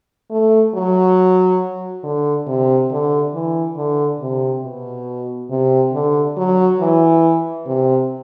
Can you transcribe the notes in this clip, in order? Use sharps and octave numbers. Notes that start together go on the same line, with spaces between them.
A3
F#3
D3
C3
D3
E3
D3
C3
B2
C3
D3
F#3
E3
C3